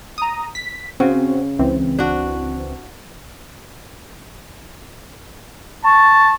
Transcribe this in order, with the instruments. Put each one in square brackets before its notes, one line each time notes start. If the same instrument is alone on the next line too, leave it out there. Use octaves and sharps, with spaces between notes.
[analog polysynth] A#5 D#6
B6
[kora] C#3 [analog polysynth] C4 F#4
[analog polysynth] C#2 E3 C4
[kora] D4 F#4
[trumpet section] A5 [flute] C#6